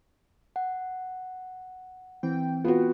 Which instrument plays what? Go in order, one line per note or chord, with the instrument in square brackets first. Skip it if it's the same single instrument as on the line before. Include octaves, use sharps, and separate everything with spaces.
[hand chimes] F#5
[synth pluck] E3 C4 G5
[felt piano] B3 F#4 [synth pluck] F4